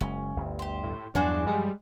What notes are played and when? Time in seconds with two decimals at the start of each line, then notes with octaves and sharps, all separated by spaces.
0.01 F#1 G#3 C#4
0.36 G1 D2 G2
0.59 G4 C5
0.83 A2
1.15 E2 G2 F3 F#3 D4 F#4 G#4 C5
1.47 G3 G#3